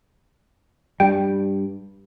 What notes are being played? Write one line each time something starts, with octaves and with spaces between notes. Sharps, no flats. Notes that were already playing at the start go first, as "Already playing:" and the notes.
G2 G3 G5